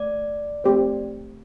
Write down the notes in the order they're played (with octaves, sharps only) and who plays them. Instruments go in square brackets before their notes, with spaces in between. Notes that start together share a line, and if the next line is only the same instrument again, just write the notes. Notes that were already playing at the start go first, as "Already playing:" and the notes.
Already playing: [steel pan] A3 [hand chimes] D5
[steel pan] A3 C4 G4 C5